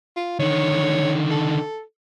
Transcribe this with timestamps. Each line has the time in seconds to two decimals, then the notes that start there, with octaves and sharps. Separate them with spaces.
0.16 F4
0.39 D3 D#3 C#5
1.31 A4